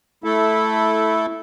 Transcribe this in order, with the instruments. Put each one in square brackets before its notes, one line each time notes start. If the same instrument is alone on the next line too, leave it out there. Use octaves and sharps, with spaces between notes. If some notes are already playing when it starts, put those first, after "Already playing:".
[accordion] A3 E4 A4